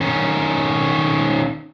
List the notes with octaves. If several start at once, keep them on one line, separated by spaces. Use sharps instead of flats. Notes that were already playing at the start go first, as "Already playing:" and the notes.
D#3 C#4